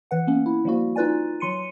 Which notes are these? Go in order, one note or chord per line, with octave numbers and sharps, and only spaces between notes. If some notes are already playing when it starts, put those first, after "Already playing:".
E3 B4 F#5
A#3 B3 C#4
E4
F3 G3 A#3 F#4
D#4 F4 B4 D5 G#5
F#3 C6 C#7 D#7